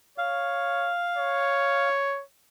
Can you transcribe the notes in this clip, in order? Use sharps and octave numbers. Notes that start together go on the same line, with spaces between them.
C#5 F5
C#5